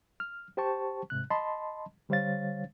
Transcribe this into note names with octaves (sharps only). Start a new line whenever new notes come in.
F6
G4 C5 G5 A5 C#6
G#2 C3 F#6
D#5 A5 B5 C6
D3 G3 C5 C#5 F5 A6